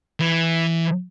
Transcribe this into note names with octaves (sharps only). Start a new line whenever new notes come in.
E3